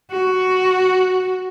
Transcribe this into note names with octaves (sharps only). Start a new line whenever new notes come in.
F#4